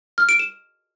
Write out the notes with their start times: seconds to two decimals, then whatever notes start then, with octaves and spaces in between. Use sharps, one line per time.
0.18 F6
0.29 D7
0.39 E7